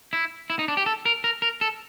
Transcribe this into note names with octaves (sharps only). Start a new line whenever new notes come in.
E4
E4
D#4
D4
G4
A4
A#4
A#4
A#4
A4